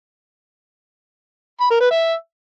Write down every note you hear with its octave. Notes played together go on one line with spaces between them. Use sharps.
B5
A#4
B4
E5